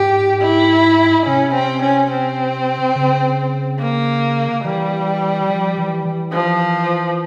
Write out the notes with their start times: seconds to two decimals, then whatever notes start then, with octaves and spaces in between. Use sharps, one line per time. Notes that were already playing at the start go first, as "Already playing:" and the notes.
Already playing: G#2 G4
0.42 E4
1.27 C3 C#4
1.55 C4
1.83 C#4
2.11 C4
2.96 C#3
3.80 A#3
4.64 E3 G3
5.49 F3
5.78 E3
6.05 E3
6.33 F3